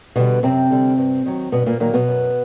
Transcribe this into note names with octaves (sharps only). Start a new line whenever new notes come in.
B2 D3 G3 B3
F#2 C3 C4
D3 G3
G2
D#3 F#3
G2 B2 B3
A#2 A#3
A#2 D#3 F#3 A#3
B2 B3
F#2